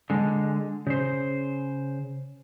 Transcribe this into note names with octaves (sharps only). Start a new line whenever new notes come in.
D3 G#3
C#3 C5